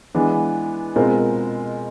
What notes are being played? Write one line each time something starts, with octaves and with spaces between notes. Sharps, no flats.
E3 G#3 B3 D4
B2 G#3 C4 F4 A#4